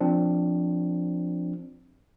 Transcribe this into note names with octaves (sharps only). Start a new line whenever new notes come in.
F3 C4 D4